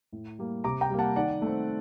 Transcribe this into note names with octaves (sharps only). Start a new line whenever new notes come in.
A2
G3 A#3
C3 A#5 D6
G5 A#5
G3 A#3
F#5 A5
D#3 D5 F#5
A3 C4